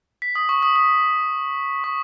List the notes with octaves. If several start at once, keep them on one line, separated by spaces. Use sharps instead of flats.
B6
D#6
C#6
D#6
D#6
C#6